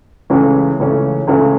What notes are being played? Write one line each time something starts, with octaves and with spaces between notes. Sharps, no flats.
C#2 C#3 E3 A3 C#4
C#2 C#3 E3 A3 C#4
C#2 C#3 E3 A3 C#4